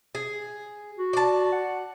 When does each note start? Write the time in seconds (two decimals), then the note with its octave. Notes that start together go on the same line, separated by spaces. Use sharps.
0.15 G#4
0.98 F#4
1.13 D5 A5
1.52 F#5